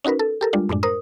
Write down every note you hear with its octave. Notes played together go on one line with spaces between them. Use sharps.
C#4 D#4 F#4 A#4 B4
A4
G4 A4 A#4
G3 G#3 D4 F4
F#2 A2 G#3 D4
A#4 C5 D#6